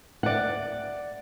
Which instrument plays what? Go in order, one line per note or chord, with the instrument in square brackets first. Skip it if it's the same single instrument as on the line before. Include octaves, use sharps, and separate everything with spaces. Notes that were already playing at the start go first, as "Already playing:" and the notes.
[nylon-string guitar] D5 F#5